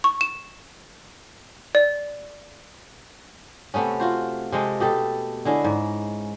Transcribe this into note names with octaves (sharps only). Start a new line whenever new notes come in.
C#6
E7
D5
C3 A3 B3 C#4
F4 F#4 C5
C3 G#3 A3
B2 G4 A4
D3 G#3 C#4 E4
G#2